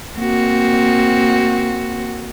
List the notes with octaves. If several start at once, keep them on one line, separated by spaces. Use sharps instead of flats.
A#3 C4 F#4